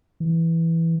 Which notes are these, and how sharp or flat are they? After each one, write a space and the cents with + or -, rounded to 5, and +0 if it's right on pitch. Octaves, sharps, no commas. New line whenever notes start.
E3 +0